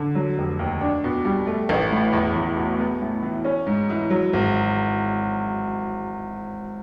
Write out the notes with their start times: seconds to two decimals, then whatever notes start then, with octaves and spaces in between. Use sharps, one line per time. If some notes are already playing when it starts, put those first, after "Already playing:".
Already playing: D3
0.15 F#3
0.38 F1
0.59 D#2
0.81 D4
1.04 B2
1.25 G3
1.47 A3
1.69 A1
1.91 A2
2.13 E2
2.36 E2
2.57 B2
2.79 B3
3.01 A2
3.23 E3
3.45 C#4
3.67 G#2
3.90 E3
4.10 F#3
4.33 G#1